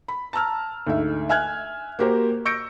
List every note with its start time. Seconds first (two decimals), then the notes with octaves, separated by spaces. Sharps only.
0.08 B5
0.33 A5 A#5 E6 F6
0.87 D2 G#2 E5
1.29 E5 G#5 F6 F#6 G#6
1.99 A#3 F#4 G4 A#4 C5
2.45 C#6 E6 G6 A#6 C#7 D7